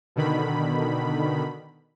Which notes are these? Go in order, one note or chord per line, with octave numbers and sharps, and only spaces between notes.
B2 D3 D#3 B5